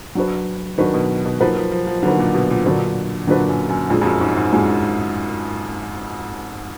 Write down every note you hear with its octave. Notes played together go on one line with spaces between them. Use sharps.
F#3 D4 F#4 B4
D#3 F#3 D4 F#4 B4
B2
B2
F3 F#3 A#3 D#4 F#4 B4
F3
F3
F3
D3 F#3 A#3 D#4 F#4 B4
A#2
B2
A#2
A#2 D3 F#3 D4 F#4 B4
A#2 D3 F#3 D4 F#4 B4
F#2
F#2
F2 A#2 G#3 D4 G#4
F2
F#2
G#2
G#2
F#2 A#2 G#3 D4 G#4